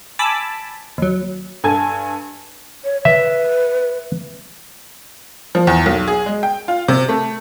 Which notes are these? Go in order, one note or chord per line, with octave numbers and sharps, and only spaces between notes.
G#5 A5 B5 D6 E6
D#2 F#3
G2 A4 G#5 A5 G#6
C#5
B4 E5
F3
E2
B1
G#4
G#3
G5
F4
C3
A3